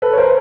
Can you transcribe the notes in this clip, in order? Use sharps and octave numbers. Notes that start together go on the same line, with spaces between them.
A4 B4
C#5
A#4 C5